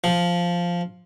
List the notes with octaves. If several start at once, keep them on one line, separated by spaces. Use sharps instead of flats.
F3